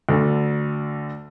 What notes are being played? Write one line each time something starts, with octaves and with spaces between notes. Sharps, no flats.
D2 D3